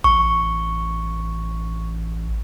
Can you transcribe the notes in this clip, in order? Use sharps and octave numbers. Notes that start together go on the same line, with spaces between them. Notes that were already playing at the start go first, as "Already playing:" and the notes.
A1 C#6